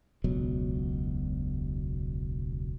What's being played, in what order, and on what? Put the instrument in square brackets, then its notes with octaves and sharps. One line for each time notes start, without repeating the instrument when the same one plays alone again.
[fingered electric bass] E1 C#2 B2 F#3